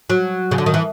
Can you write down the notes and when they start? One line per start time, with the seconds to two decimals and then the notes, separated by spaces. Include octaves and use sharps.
0.10 F#3
0.51 C#3
0.58 D3
0.66 D#3
0.74 E3